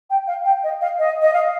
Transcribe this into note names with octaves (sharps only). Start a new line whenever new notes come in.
G5
F5
G5
D#5
F5
D#5
D#5
F5